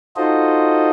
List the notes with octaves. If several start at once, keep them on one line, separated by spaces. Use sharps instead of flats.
D#4 F4 F#4 A4 C5 D#5